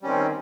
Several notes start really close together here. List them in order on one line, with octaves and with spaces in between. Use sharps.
G3 C#4 D#3 C4